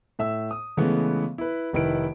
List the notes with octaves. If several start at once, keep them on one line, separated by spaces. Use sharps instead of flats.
A2 E5 E6
D#6
C#3 E3 G#3 A3 B3
E4 B4
F1 D#3 E4 B4 D7